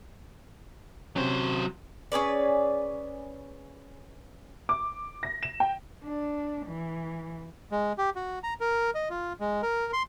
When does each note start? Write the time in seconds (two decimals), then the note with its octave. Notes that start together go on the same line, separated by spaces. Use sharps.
1.16 C3 F#3 C4 C#4 C5
2.12 C#4 G#4 B4 D5
4.69 D6
5.23 A#6
5.43 E7
5.60 G5
6.04 D4
6.66 E3
7.72 G#3
7.98 G4
8.16 F#4
8.43 A#5
8.60 A#4
8.95 D#5
9.10 F4
9.40 G#3
9.62 A#4
9.93 C6